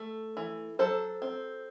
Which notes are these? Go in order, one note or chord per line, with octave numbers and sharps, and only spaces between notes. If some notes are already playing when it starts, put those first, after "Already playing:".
Already playing: A3
E3
F#3 A4 C5
C4